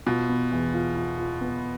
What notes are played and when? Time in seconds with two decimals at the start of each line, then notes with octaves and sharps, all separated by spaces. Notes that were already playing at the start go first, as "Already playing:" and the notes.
0.06 B2 F4
0.29 B3
0.51 E2
0.74 F4
0.96 F4
1.18 F4
1.41 B3